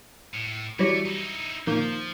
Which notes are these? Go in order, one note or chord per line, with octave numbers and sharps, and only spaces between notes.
A2
E3 F#3 G3 A3
D#4 E4
A#2 D#3 F3